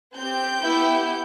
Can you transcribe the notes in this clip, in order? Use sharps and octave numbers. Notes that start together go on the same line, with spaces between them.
C4 G4 G6
B3 E4 G4